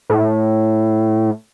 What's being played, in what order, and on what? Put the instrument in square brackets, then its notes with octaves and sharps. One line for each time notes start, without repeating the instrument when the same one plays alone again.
[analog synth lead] A2